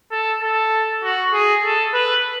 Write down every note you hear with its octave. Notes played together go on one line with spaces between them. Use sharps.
A4
A4
F#4
G#4
A4
B4